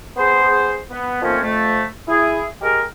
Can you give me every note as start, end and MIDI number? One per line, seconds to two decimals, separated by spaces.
0.17 0.76 59
0.17 0.76 68
0.17 0.76 72
0.91 1.22 59
1.22 1.38 51
1.22 1.38 53
1.22 1.38 57
1.22 1.38 58
1.22 1.38 60
1.22 1.38 61
1.42 1.84 41
1.42 1.84 57
2.08 2.43 64
2.08 2.43 68
2.62 2.81 56
2.62 2.81 67
2.62 2.81 68
2.62 2.81 70